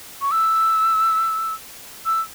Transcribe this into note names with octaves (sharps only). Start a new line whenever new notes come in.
C#6
E6
E6